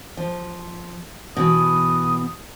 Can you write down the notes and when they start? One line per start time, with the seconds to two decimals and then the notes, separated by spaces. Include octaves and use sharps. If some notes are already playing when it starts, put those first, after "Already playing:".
0.17 F3
1.37 B2 E3 D#6